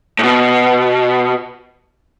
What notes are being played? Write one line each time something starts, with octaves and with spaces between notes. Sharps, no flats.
A2
B2